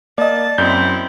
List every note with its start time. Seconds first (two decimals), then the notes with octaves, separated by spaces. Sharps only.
0.18 A#3 D5 D#5 A5
0.58 F#2 C4 E4 G6